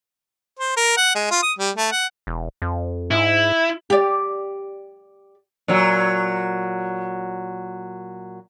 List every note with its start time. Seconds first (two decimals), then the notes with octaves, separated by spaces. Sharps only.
0.59 C5
0.77 A#4
0.97 F#5
1.15 G#3
1.31 F4
1.43 D#6
1.59 G3
1.76 A3
1.92 F#5
2.27 E1
2.62 F2
3.11 G#2 E4
3.90 G4 D5
5.68 A#2 F#3